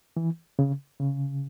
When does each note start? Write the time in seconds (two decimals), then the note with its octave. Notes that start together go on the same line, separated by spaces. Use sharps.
0.17 E3
0.59 C#3
1.00 C#3